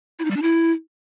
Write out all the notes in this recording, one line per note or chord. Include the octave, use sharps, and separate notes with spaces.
E4
D#4
G3
D4
E4